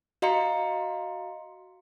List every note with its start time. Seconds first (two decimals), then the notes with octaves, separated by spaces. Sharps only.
0.22 F#4 D#5 F5 A#5 C6 C#7